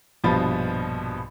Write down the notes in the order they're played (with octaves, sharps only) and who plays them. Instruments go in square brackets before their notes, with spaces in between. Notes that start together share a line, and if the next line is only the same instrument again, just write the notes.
[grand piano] A#1 G2 B2 F3 B5 A6